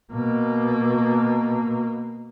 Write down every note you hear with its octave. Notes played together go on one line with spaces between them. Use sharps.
B2 A#3